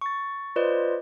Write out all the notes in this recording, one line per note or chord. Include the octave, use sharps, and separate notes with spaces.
C#6 A6
F4 B4 C5 D5 D#5